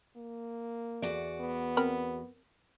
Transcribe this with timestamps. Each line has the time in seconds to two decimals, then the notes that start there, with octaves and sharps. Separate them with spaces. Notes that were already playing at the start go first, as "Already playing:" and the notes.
0.17 A#3
1.02 E2 F#4 D5
1.40 B3
1.77 C4 A#4 B5